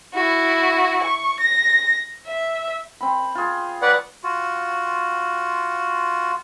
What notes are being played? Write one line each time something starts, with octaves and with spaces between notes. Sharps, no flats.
E4 F#4
C#6
A#6
E5
C4 B5
F4 G#4
B4 C#5 D5 F#5 A#5
F4 F#4